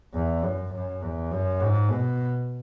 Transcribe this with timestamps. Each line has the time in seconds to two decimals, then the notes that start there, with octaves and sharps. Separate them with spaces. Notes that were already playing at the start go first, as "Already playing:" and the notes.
0.14 E2
0.43 F#2
0.73 F#2
1.02 E2
1.31 F#2
1.60 G#2
1.89 B2